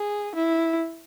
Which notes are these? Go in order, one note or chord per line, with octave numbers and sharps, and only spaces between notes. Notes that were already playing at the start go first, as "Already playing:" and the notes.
Already playing: G#4
E4